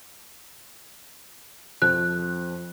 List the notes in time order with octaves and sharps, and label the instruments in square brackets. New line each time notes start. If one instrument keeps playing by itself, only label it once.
[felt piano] F2 F3 [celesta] F#6